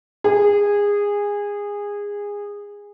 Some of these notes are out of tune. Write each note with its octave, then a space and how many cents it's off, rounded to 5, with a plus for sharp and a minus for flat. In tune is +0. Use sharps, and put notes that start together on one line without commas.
G#4 -20